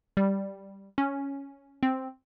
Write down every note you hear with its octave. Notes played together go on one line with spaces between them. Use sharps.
G3
C#4
C4